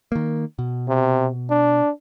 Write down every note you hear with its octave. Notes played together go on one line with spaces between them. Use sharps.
D#3 A#3
B2
C3
D4